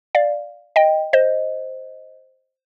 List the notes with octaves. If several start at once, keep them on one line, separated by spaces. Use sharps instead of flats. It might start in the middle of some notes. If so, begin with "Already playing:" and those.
D5 F5
D#5 G5
C5 D#5